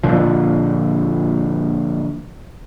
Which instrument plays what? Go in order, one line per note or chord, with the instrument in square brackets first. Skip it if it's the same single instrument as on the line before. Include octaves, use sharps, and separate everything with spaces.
[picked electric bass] A#2 D3 F3